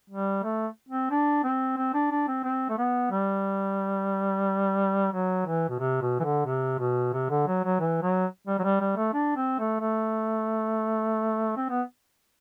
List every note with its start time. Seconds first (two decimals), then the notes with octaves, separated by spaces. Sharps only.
0.10 G3
0.44 A3
0.89 C4
1.11 D4
1.44 C4
1.77 C4
1.94 D4
2.11 D4
2.28 C4
2.44 C4
2.69 A3
2.78 B3
3.11 G3
5.12 F#3
5.46 E3
5.69 B2
5.79 C3
6.02 B2
6.20 E3
6.24 D3
6.46 C3
6.79 B2
7.13 C3
7.30 D3
7.47 F#3
7.64 F#3
7.80 E3
8.02 F#3
8.47 G3
8.59 F#3
8.63 G3
8.80 G3
8.97 A3
9.14 D4
9.36 C4
9.59 A3
9.80 A3
11.57 C4
11.70 B3